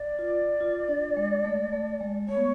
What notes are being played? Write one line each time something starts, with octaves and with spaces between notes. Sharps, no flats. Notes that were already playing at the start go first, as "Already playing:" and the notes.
Already playing: D5
F4
F4
D4
G#3
A3
A3
G#3
A3 C#5
B3